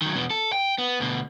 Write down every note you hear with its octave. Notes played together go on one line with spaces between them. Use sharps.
D#3 F#3
E2 B2
A4
G5
B3
D2 B2